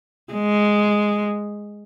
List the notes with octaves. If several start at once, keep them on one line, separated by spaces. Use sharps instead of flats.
G#3